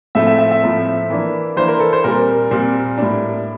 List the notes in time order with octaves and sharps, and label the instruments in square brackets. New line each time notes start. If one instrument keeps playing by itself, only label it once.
[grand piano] A2 F3 A3 C4 E5
E5
E5
E5
A2 F3 A3 C4
E3 A#3 D4
E3 A#3 D4 C5
A#4
A4
C5
A#2 G3 C4 A#4
A#2 G3 C4
A2 G3 D4